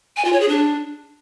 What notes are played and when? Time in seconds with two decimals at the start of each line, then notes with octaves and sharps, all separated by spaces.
0.17 G#5
0.25 F4
0.33 C#5
0.41 G#4
0.49 D4